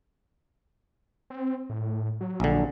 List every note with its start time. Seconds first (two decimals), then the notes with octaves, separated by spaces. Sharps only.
1.30 C4
1.70 A2
2.21 F#3
2.40 A#1 D3